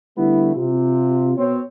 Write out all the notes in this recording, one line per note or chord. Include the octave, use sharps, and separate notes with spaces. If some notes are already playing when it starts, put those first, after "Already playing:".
D3 G3 A3 B3 E4
C3 F4
B2 C4 C#5